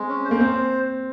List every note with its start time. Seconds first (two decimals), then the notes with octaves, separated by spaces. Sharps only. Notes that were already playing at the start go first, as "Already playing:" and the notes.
Already playing: G#3 C4
0.08 C#4
0.25 C5
0.31 A#3
0.40 C4 C5